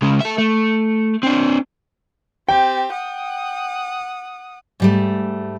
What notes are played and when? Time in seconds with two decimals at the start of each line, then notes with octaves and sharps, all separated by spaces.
0.02 C#3 G#3
0.21 A4 E5
0.38 A3
1.23 C4 D4
2.49 C4 G4 G5
2.93 F#5 D#6
4.80 G#2 G3 A3